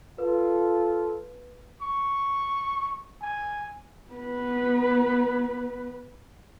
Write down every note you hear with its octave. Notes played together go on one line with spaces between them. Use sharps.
F4 A4 B4
C#6
G#5
B3 B4